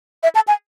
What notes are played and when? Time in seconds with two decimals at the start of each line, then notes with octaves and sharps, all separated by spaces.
0.23 E5
0.35 A5
0.48 G#5